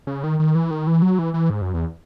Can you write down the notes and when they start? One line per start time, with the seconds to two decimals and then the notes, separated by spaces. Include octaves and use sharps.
0.07 C#3
0.24 D#3
0.40 D#3
0.55 E3
0.71 D#3
0.87 E3
1.02 F#3
1.19 E3
1.34 E3
1.50 G#2
1.62 F#2
1.74 E2